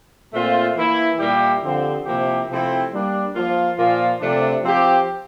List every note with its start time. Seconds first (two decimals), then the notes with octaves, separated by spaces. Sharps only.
0.33 A#2 A3 C4 F4
0.76 E3 A#3 E4
1.19 A#2 G3 A#3 E4 G4
1.62 D3 F3 C4 G4
2.06 C3 F3 A#3 E4 G4
2.48 C3 F3 A3 C4 E4
2.91 G3 A#3 D4
3.35 F3 A#3 F4
3.77 A#2 F3 A#3 F4
4.20 C3 F3 A3 D4
4.63 F3 C4 G4